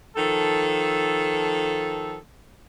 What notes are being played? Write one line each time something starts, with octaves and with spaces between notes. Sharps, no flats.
D#3 F3 A4